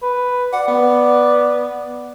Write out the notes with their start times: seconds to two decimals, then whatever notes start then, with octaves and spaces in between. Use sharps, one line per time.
0.02 B4
0.53 D5 F#5
0.68 B3